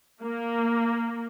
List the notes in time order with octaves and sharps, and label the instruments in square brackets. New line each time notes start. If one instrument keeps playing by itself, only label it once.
[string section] A#3